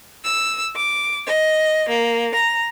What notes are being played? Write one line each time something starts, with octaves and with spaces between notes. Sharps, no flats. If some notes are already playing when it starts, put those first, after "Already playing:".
E6
D6
D#5
A#3
A#5